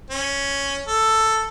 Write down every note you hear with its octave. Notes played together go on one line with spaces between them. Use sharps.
C#4
A4